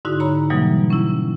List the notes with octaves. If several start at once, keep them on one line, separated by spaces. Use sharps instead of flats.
G#2 D3 D#4 E4 F#4
C#5 A#5 B5
B2 E3 F#3 G3 A#3
C#4 E4